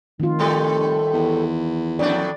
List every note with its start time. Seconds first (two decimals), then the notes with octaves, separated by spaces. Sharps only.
0.20 F1 D#3 F4
0.39 A2 G3 A4
1.14 E2
1.99 F2 A2 D4 D5